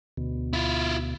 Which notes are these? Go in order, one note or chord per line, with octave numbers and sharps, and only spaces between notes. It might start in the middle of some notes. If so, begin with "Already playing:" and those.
D2 B2
E4 F4